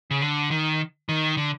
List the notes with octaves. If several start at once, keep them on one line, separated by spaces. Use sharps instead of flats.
C#3
D3
D#3
D#3
D3